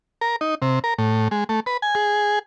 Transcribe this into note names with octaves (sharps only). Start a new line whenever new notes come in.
A#4
D#4
C3
A#4
A2
G#3
A3
B4
G#5
G#4